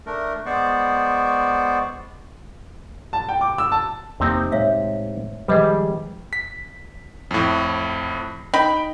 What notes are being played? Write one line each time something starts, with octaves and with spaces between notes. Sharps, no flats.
A3 D4 A#4
G#3 B3 C5 D5 C#6
A5
G5
D6
E6
A5
E2 C3 A#3 C4 D#4
A2 G#3 A3 C#5 E5 F5
D#3 F3 G3 G#3 G#4 B4 D#5
B6
F2 A2
D#4 G5 B5